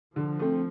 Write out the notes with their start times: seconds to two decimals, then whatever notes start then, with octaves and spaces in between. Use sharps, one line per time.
0.15 D3 F3
0.39 A3 C4